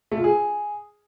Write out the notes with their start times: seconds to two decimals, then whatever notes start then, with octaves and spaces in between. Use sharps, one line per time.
0.12 A3
0.18 F4
0.24 G#4